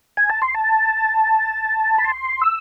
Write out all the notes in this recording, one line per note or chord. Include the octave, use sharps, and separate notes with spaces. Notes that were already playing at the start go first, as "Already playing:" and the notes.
G#5
A5
C6
A5
B5
C6
E6